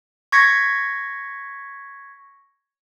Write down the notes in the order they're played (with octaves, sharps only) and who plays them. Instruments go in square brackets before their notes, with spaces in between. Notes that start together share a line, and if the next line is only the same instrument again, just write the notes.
[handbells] C#6 G#6 A#6 B6 C#7